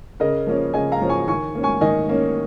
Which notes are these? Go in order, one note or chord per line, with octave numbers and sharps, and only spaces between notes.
C#3 A#4 D#5
F3 A#3 C#4
C#3 D#5 G#5
F5 A#5
F3 A#3 C#4
G#5 C#6
D#3 G#5 C#6
A#3 C#4
G#5 C#6
D#3 D#5 G#5
A#3 C#4